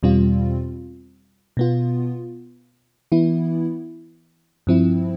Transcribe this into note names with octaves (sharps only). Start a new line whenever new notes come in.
E2 B2 G3 C4 F4
B2 B3 F4
E3 B3 E4
G2 F3 C4 E4